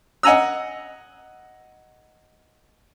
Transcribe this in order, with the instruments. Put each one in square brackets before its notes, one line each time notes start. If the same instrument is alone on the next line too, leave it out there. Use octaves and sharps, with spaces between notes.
[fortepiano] D#5 F#5 G#5 A#5 E6